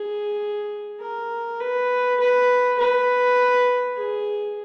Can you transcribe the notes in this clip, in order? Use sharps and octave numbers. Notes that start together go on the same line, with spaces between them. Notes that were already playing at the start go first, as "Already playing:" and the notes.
Already playing: G#4
A#4
B4
B4
B4
G#4